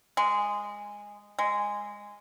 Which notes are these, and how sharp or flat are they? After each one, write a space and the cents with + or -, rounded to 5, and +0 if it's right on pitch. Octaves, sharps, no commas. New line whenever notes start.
G#3 -10
G#3 -10